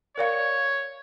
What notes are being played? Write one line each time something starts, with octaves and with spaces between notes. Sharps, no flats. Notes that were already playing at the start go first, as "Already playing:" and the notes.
A#4 C#5 D5 F5